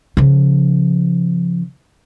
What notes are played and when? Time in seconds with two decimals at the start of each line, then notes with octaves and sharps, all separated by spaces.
0.17 C#3 F3